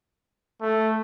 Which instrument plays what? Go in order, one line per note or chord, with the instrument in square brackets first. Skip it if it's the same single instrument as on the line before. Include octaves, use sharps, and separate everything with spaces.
[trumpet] A3